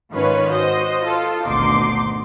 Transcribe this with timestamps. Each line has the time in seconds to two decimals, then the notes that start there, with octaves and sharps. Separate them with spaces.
0.12 G#2 D#3 C#4 F4 B4 C#5
0.52 F#4 C5 D#5
1.05 F4 A4
1.46 G#1 D2 B2 D#4 C6 D6